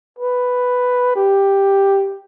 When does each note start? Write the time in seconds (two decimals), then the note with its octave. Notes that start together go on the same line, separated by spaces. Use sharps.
0.19 B4
1.16 G4